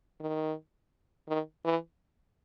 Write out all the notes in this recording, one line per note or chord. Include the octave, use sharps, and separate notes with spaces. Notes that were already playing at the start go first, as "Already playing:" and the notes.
D#3
D#3
E3